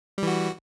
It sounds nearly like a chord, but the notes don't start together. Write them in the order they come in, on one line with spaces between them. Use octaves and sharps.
G3 E3 F#4